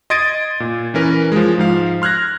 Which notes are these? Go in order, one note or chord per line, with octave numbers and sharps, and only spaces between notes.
D#5 C6 G#6 A6 D7 D#7
A#2
E3 C#4 A#4 B4
F3 G#3
G#2 F3 F5
C6 F6 F#6 G#6 A#6